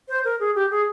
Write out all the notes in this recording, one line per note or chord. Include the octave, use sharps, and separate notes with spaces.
C5
A#4
G#4
G4
G#4